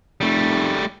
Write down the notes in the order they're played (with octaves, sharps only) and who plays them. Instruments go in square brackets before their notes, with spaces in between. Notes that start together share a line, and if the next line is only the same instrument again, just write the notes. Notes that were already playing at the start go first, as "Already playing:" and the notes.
[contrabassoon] F1 [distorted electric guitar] G3 A3